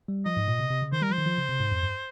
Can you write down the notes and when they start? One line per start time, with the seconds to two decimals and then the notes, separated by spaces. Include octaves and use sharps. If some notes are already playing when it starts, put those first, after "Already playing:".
0.08 G3
0.25 F3 D#5
0.37 G#2
0.48 A#2
0.59 C3
0.70 C3
0.82 C#3
0.92 D#3 C5
1.02 G3 A#4
1.10 F3 C5
1.18 D#3
1.26 F3
1.38 C#3
1.49 C3
1.60 G#2
1.71 F2
1.83 G2